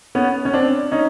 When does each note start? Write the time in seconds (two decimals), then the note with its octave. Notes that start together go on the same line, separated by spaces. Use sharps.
0.15 B3 C#4
0.45 C#4
0.54 C4 D4
0.91 C#4 D#4